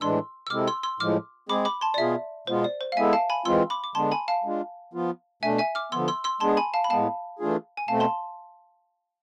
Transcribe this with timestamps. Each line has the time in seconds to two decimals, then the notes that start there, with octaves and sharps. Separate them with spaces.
0.01 A2 E3 G#3 D4 C6 E6
0.47 E6
0.50 C3 G#3 C4 E4 A4 D6 F6
0.67 C6 E6
0.83 C6 E6
1.00 A2 F3 G#3 D6 F6
1.49 G#3 C4 G#4 B5 D6
1.65 B5 D6
1.81 A5 C6
1.94 D5
1.98 B2 B3 F4 G#4 E5
2.47 B2 G#3 B3 F4 C5
2.64 D5
2.81 C5
2.92 F5
2.97 G#3 B3 E4 A4 E5 G#5
3.13 F5 A5
3.30 G#5 B5
3.45 E3 G#3 C4 F4 C6 E6
3.70 B5 D6
3.84 D6
3.95 D3 G#3 B3 D4 A5 C6
4.11 G#5 B5
4.28 F5 A5
4.44 G#3 D4 F4
4.93 F3 B3 F4
5.43 B2 A3 D4 E5 G#5
5.59 E5 G#5
5.75 D6 F6
5.92 D3 F3 B3 C6 E6
6.08 C6 E6
6.24 C6 E6
6.40 G#3 B3 D4 G#4 A5 C6
6.57 G#5 B5
6.74 F5 A5
6.84 B5
6.90 A2 G#3 B3 F5 A5
7.39 E3 A3 D4 F4 G#4
7.77 G#5
7.88 B2 A3 C4 F5 A5
8.00 A5 C6